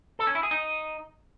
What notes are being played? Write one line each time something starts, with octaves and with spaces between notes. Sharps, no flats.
A4
C#4
E4
G#4
D#4